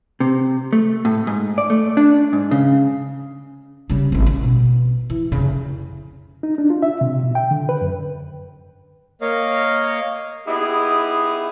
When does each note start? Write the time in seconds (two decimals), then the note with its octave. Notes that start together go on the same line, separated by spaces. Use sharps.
0.20 C3
0.73 A3
1.05 A2
1.27 G#2
1.58 D5
1.70 A3
1.97 D4
2.33 G#2
2.51 C#3
3.90 C#3 G3
4.12 G#1 C4
4.27 C#4
4.44 B2
5.10 E3
5.32 F1 C#3
6.43 D#4
6.58 D4
6.70 F4
6.82 E5
7.01 C3
7.23 B2
7.35 G5
7.51 D3
7.69 B4
7.81 F#2
9.21 A#3 A#4 C#5 D#5 F5
10.47 B3 D#4 E4 G4 G#4